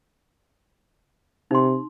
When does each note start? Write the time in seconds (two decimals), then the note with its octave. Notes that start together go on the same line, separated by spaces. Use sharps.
1.51 C3 D#4 C6